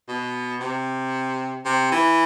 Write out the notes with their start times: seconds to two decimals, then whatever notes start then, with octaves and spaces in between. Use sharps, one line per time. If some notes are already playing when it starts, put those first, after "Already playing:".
0.08 B2
0.61 C3
1.65 C3
1.92 E3